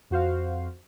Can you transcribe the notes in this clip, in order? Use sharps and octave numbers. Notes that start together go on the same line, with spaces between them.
F2 F#4 C5 F5